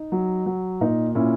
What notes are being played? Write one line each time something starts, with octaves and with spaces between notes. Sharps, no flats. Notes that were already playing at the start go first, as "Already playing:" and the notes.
Already playing: D#4
F#3
F#3
A#2 D#4
A#2 C#4 E4